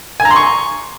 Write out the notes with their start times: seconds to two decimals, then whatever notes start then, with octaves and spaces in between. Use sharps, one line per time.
0.20 G#5
0.25 A#5
0.30 C6
0.36 C#6